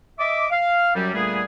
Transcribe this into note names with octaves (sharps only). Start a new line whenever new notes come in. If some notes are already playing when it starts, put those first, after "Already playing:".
D#5 E5 D6
F5
F#2 F#3 G3
A#2 D3 G3 A3 B3 G#4